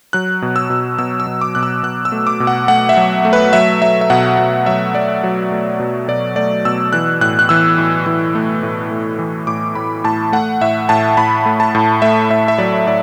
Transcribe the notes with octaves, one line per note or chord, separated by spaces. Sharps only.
F#3 F#6
B2
E6
B2
B2 E6
E6
B2
D6
B2 F#6
E6
B2 F#6
E6
A3
D6
B2
F#5
A3 F#5
E5
F#3
A3
B4
F#3 E5
F#3 E5
E5
B2 F#5
B2
F#3 E5
F#3 D5
F#3
A3
B2
B2 D5
A3 D5
B2 E6
E3 F#6
A2 F#6
F#6
E3 E6
A2
E3
A3
A2
A3
E3
A2 D6
A2 B5
A2 A5
A3 F#5
A2 E5
A2 A5
A2 B5
A3
A5
A2
A3 E5
A2 E5
E5
F#3 D5
A2 D5